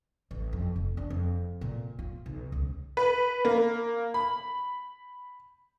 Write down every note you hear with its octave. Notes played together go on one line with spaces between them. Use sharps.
A1
F2
F1
D4
F2
A#2
F4
B1
C#2
B4
A#3
B5